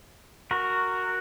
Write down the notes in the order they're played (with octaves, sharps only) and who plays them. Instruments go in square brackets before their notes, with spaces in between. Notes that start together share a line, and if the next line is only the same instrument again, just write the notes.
[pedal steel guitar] F#4 A#4